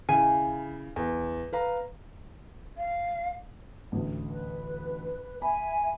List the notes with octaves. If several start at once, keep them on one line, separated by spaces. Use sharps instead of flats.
C#3 E4 G#5
E2
B4 F5 A#5
F5
A1 D2
B4
E5 G#5 B5